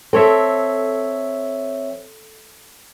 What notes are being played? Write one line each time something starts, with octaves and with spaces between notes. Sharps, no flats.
C4 A4 C#5 E5